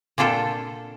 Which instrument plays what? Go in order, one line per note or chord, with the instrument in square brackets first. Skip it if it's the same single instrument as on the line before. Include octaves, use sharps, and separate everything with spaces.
[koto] A#2 D4 F4 A4 G5